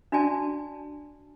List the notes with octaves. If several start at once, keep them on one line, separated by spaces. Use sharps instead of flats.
D4 F#4 D5 G#5 A5